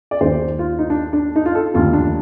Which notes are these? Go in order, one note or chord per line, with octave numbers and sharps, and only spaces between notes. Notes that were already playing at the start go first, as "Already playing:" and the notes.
D5
D#2 D#3 C5
F4
D#4
D4
D4
D#4
F4
A4
F1 D#2 D3 F4
D4